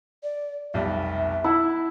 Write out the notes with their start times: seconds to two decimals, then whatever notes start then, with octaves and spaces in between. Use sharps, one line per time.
0.23 D5
0.74 F1 B1 G3 E5
1.44 E4 F#5 A5